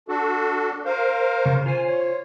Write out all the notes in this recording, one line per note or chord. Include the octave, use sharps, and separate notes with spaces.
D4 F#4 A4
A#4 C5 F5
C#3
F4 C5 G#5
C#5